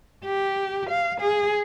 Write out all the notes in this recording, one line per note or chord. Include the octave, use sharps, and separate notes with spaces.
G4
F5
G#4